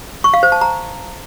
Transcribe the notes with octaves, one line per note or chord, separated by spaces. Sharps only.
C#6
F5
C5
A5
A#5